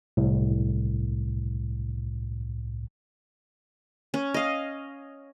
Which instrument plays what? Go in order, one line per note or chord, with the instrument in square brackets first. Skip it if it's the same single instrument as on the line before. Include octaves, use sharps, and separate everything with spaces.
[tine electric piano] C2 A2
[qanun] C#4
D#5 F5